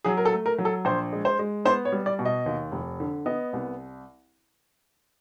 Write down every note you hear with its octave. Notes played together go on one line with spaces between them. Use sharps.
F#3 G#4
A#4
A4
A3
A#4
F#3
A4
A#1 C5
G#3
C5
G#3
B3 C5
C#5
G3
D5
B2
D#5
D#2
F1
D3
B3 D#5
C2